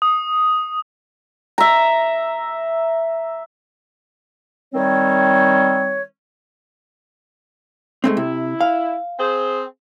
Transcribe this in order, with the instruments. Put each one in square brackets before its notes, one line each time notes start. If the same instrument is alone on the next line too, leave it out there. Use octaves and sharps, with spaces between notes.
[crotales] D#6
[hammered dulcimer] E5 A#5
[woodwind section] D#3 G3 C4 C#5
[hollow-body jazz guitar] G#3 A3 C4
[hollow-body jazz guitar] C3 [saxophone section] E4
[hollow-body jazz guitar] F5
[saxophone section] C4 G#4 C5